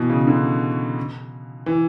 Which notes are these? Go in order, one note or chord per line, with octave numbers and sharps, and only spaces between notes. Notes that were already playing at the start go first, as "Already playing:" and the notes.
Already playing: B2 E3
C#3
D3
E3